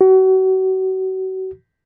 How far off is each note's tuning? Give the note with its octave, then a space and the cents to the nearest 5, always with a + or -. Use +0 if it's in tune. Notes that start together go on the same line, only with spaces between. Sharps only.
F#4 +35